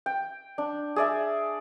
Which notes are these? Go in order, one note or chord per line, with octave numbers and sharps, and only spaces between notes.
G5
D4
G#4 D5 E5